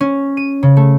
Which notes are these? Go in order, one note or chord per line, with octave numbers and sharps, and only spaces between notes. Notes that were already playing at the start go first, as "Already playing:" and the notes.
C#4
D#7
C#3
A3